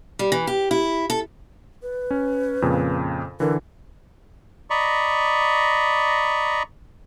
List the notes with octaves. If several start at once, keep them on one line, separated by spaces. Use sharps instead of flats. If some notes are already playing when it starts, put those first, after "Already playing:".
G3
E3
G4
E4
A4
B4
C#4
F2 A#2 C#3
D3 E3 A#4
D5 D#5 A#5 B5 C#6